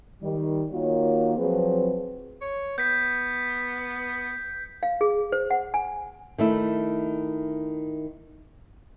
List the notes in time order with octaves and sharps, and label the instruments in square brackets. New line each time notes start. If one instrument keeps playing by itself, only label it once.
[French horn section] D#3 G3
D#3 A#3 F4 F#4 C#5
F3 F#3 C4 G#4 B4
[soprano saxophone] C#5
[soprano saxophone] B3 [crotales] G6 B6
[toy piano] F5
G#4
C5
F#5
G#5
[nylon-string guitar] D#3 A3 E4